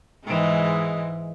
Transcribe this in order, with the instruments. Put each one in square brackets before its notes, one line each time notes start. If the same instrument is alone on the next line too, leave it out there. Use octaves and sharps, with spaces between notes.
[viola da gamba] G#2 E3 G#3